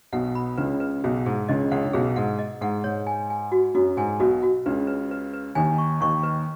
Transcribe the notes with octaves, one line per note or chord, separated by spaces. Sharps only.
B1 B2 F#5
B5
C#2 C#3 B4
B4
B1 B2 G#4
G#2 G#4
C#2 C#3 D#5
C#2 C#3 F#5
C#3
B1 B2 G#4
G#2 F#5
D#5
G#2 F#5
G#2 C#5
G#5
G#5
F#4
F#2 F#4
G#2 G#5
B1 B2 F#4
F#4
C#2 C#3 B4
B4
B4
B4
D#2 D#3 G#5
C#6
D#2 D#3 C#6
B4